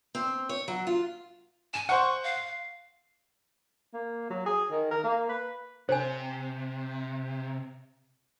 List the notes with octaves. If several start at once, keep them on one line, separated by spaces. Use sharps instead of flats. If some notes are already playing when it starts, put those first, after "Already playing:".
C4
C#5
F#3
F4
G#5 E7
C5 F#5 C#6
F5
A#3
F#3
G#4
D#3
A#4
A#3
B4
C3 C5 G#5